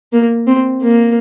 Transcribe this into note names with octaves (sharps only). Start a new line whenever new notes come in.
A#3
C4
A#3